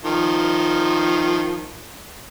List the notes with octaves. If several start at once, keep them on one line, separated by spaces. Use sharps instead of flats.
D#3 F3